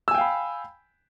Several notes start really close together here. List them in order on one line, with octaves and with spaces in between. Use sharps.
E6 G#5 G5 F5 B5